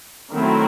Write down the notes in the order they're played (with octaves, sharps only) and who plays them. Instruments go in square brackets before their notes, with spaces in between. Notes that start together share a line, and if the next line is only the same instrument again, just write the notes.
[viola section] D#3 F#3 A3 C4 E4